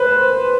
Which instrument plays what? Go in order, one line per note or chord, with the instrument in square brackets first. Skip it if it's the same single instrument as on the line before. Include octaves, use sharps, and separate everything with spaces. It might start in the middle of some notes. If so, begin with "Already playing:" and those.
Already playing: [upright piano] B4 C5